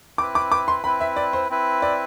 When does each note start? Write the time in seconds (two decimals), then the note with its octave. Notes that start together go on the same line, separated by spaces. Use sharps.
0.18 C4 E4 B4 D6
0.35 D6
0.52 D6
0.68 C6
0.84 C4 E4 B4 B5
1.01 E5
1.16 D5
1.33 C5
1.50 C4 E4 B4
1.82 D5